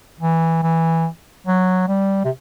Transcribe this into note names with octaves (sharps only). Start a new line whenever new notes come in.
E3
E3
F#3
G3
C3